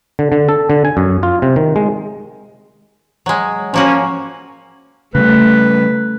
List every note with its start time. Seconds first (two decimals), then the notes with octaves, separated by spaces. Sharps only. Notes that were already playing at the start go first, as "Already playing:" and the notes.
0.19 D3
0.32 D3
0.49 A4
0.70 D3
0.85 G#5
0.97 F#2
1.23 F4
1.42 C3
1.56 D#3
1.76 G#3
3.26 F#3 G#3
3.74 F3 A#3 C#4 F#4
5.15 C#3 G3 A3 B4